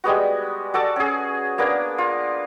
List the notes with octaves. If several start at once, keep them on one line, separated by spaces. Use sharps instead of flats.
G3 G#3 B3 F#4
F#4 A4 D5 A5
C#4 G#4
A#3 B3 D4 A#4
F4